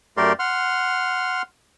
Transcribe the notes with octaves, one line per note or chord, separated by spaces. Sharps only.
F#2 A3 G4 A#4 D5 C6
F#5 C6 F6